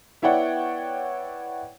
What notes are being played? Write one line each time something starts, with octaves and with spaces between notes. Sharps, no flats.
B3 E4 C#5 D5 F#5 G5